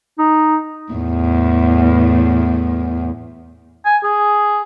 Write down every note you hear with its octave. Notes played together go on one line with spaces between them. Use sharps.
D#4
E2 A2
G#5
G#4